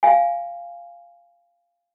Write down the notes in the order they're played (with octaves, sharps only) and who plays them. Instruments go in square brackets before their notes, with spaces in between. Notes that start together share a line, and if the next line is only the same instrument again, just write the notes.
[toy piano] F5 G#5